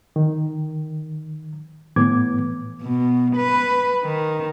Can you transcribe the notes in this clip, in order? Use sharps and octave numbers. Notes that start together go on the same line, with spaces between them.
D#3
A2 E3 B3 D6 G#6
B2
B4
D#3